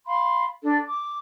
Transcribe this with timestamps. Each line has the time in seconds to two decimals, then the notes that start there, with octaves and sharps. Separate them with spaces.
0.06 F5 B5 C6
0.62 D4 A4
0.87 D6